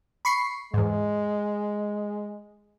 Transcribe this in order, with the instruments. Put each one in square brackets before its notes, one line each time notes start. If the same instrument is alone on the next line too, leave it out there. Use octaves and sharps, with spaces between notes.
[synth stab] B5 C#6 C7
[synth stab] E2 G#2 [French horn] G#3